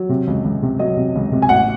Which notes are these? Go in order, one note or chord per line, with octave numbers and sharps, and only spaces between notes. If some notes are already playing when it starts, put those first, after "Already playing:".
Already playing: F#3
C3
C#2
C#2
C3
F#3 D#5
C3
C#2
C3
G#5
A1 F#5